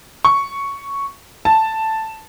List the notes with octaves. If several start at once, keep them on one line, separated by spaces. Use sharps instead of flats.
C#6
A5